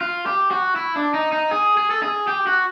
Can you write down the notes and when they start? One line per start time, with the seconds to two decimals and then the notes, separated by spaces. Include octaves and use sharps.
0.01 F4
0.26 G4
0.51 F#4
0.76 E4
0.96 D4
1.14 D#4
1.32 D#4
1.51 G#4
1.77 G#4
1.91 A4
2.03 G#4
2.27 G4
2.47 F#4